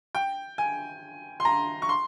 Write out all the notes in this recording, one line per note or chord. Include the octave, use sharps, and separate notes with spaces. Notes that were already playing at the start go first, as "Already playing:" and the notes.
G5
G#5
C6
A#5
C#6
C6